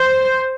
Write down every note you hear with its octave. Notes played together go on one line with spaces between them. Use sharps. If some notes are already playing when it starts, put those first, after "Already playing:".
Already playing: C5